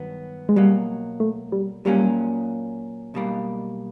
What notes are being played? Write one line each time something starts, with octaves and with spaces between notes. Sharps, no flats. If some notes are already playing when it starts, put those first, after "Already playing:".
Already playing: G2 D#3 F#3 B3
G#3
B2 F#3 G3 A#3
A3
G3
A#2 F#3 G3 A#3 C#4
B1 B2 G3 A#3